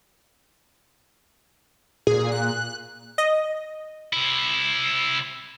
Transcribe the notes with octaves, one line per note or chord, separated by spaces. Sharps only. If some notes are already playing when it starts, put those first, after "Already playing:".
A#2 G#4
F#6
D#5
C3 E4